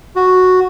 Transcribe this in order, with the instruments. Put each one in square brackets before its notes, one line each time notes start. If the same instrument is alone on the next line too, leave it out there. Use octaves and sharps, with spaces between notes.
[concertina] F#4